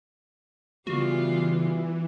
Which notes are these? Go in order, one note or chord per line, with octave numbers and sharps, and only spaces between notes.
C#3 E3 G3 B3 F4 F#4